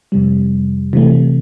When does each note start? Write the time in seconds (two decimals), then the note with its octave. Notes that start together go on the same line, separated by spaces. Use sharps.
0.12 F2 C3 G3
0.93 C3 E3 A3